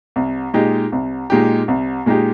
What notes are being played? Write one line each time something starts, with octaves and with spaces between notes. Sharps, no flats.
C2
A#2 G#3 D#4 G4
C2
A#2 G#3 D#4 G4
C2
A#2 G#3 D#4 G4